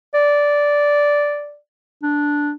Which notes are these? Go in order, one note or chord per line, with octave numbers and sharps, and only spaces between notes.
D5
D4